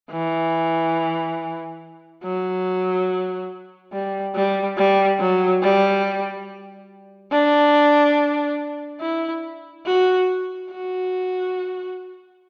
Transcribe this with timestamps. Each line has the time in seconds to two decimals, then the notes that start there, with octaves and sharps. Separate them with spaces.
0.11 E3
2.23 F#3
3.93 G3
4.35 G3
4.77 G3
5.20 F#3
5.62 G3
7.32 D4
9.01 E4
9.86 F#4
10.71 F#4